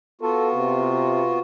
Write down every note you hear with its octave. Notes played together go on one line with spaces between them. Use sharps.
B3 F4 F#4 A4
C3